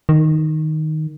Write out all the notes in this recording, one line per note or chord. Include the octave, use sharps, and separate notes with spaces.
D#3